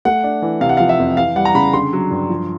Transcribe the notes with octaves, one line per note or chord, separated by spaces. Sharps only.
A3 F#5
D4
E3
C3 F5
F#5
F3 F5
E5
F2
E3 F5
G3 F#5
A#5
C#3 B5
D3 C6
F#3
G2
F3